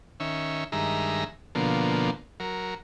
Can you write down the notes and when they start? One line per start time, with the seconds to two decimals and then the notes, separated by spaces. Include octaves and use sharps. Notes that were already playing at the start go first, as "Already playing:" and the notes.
0.20 D#3 C#4 E5
0.72 G2 D#3 G#3 E5 A#5
1.55 B2 D3 F3 A#3
2.40 F#3 A#4